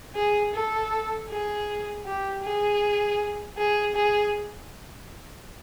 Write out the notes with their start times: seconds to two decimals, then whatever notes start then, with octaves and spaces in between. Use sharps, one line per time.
0.16 G#4
0.54 A4
1.30 G#4
2.06 G4
2.43 G#4
3.58 G#4
3.96 G#4